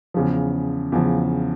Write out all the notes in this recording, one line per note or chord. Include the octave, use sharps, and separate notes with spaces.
E2 C#3 F3
E2 C#3 F3